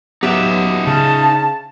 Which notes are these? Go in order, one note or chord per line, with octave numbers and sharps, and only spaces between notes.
F#3 B3 D#4 G4 E5
C#3 A5